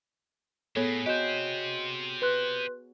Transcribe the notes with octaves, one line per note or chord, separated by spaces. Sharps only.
A2 B3 G#4 A4 C#5
F#4 G4 C5 D#5 G6
B4 C6 F#6